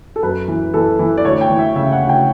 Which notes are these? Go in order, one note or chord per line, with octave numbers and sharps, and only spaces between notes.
A4
F#2 B4
E3
E3 A4
E3
D5
D2 C#5
G5
E3
E5
C#3 E5
F#5
D2
G5